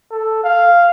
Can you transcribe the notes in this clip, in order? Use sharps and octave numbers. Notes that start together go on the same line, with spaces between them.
A4
F5